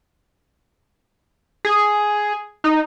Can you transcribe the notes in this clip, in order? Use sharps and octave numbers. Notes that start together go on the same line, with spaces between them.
G#4
D#4